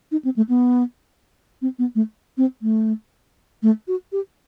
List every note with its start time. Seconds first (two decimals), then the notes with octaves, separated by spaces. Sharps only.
0.12 D#4
0.25 C4
0.36 A3
0.49 B3
1.62 C4
1.79 B3
1.95 A3
2.37 C4
2.62 A3
3.63 A3
3.88 F#4
4.12 G4